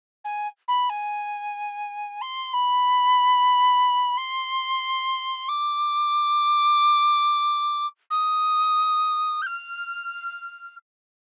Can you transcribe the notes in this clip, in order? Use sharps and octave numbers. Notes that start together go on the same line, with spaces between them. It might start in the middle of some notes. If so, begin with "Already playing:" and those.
G#5
B5
G#5
C6
B5
C6
D6
D#6
G6
F6